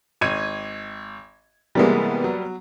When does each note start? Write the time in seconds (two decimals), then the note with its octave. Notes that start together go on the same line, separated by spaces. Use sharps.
0.21 G#1 G#6 D#7
1.75 C3 E3 G3 G#3 A#3 B3
2.24 F#3